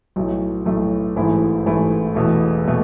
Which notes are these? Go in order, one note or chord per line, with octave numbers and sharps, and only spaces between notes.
B1 A2 F#3 A3
B1 A2 F#3 A3
A1 G#2 E3 A3 E4
A1 G#2 E3 A3 E4
E1 E2 B2 A3
B2 A3